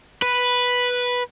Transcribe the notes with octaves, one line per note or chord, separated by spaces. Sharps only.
B4